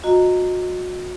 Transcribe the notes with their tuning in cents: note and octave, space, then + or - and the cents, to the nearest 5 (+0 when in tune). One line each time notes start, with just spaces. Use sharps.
F#4 -30 D#5 +0 A#5 -15